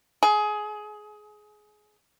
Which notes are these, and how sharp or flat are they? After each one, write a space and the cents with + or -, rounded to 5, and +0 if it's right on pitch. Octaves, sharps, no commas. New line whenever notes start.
G#4 +20